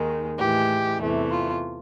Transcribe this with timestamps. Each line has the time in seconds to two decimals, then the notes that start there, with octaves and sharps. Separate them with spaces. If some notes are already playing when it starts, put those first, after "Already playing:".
Already playing: D#2 D#3 G#3
0.38 A2 E3 G#3 G4
1.00 E2 C3 E3 A3
1.31 F4